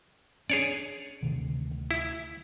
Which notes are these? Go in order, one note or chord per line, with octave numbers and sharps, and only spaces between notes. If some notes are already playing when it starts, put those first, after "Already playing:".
C#4 D4 G#4 C#5 D5
D2 C3 D#3
E4